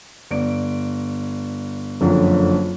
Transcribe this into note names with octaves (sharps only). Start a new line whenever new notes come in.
G1 D5 D7
F#1 F2 D3 F3 F#3